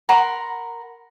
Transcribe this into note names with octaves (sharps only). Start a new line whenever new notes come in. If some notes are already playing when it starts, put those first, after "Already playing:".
A#4 F#5 B5 C6